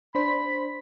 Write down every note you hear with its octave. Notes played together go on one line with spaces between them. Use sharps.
D4 C5 B5 B6